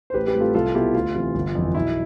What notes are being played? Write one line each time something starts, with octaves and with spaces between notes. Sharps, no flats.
C5
A1 G4 B4
G4 B4
A2 G3 C4
F4 A4
C2 F4 A4
B2 B3 E4 G4
D2 F4
C3 E3
G1
F2 E3
B1 E4